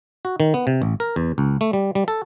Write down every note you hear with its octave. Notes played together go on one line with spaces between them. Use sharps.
F#4
D#3
B3
C3
A1
A#4
E2
C#2
A3
G3
G3
A4